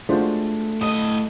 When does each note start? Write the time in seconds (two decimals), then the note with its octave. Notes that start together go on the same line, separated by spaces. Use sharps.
0.09 G#3 A3 D4 F4 F#4 C5
0.81 A2 D#5 D#6